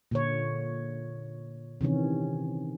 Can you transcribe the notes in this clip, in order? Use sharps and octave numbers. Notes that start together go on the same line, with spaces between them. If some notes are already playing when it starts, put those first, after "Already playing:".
A#2 D3 C#5
C3 D#3 E3 C#4